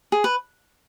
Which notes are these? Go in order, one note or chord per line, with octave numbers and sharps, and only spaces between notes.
G#4
B4